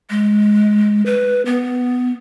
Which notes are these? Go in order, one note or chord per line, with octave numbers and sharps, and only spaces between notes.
G#3
B4
B3